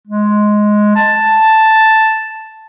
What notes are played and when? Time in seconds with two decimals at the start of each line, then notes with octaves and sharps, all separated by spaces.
0.08 G#3
0.96 A5